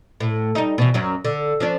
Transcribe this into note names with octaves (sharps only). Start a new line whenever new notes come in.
A2
G3 D#4
B2 E3
F#2 F#3 C#4
D3
F3 C#4 D4